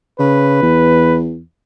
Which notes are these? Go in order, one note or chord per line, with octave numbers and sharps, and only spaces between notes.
C#3 B4
E2